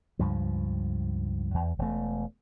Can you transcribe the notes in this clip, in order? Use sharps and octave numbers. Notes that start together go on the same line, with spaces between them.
C#2 G2 F3
E2
E1 A3